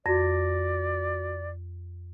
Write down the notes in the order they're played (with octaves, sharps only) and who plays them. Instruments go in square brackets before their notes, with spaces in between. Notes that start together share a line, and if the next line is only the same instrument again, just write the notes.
[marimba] F2 [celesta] F#4 A#6 [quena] D5